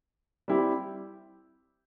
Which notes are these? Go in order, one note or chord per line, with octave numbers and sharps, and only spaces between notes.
G3 C4 E4 G4